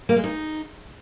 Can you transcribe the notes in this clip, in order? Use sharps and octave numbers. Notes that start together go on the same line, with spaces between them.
A#3
G#3
D#4